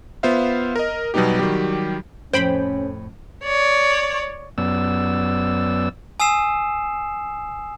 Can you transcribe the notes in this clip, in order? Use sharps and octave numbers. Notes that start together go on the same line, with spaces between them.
B3 F4 C5 E5 F5
A#4 D#5
B2 F#3 G3 B3 D#4 G4
D#3 F#3 G3 G4
F2 A2 C#4 C5 G5 B5
C#5 D5
F#2 B3 D5 E6
G#5 D#6 E6 C7 E7